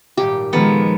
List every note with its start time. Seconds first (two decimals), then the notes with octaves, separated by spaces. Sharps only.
0.17 G#1 A#2 G3 G4
0.53 A#2 D#3 F3 G#3 B3 A4